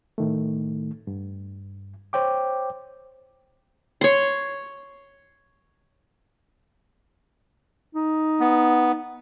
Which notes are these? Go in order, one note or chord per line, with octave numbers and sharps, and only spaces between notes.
A2 D#3 A3
G2
C5 C#5 G5 D6
C#5 C6
D#4
B3